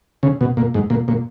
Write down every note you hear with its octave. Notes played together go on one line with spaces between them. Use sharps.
C#3
B2
A#2
G#2
A#2
A#2